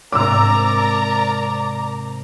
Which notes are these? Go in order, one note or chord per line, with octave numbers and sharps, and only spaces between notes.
G#2 C3 A#4 D5 A#5 D6 E6